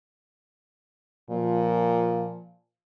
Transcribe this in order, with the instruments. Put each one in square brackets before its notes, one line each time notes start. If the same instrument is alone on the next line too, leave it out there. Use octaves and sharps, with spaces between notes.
[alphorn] A#2 [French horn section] F3